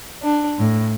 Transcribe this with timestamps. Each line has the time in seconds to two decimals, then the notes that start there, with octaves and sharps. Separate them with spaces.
0.23 D4
0.58 A2